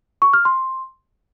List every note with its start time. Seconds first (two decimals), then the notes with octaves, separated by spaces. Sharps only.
0.22 C#6
0.33 F6
0.45 C6